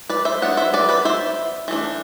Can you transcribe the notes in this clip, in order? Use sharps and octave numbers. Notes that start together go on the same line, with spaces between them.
B4 D5
C5 E5
F#3 B3 D4 F#5
C5 E5
B4 D5
B4 D5
C5 E5
E3 A3 D4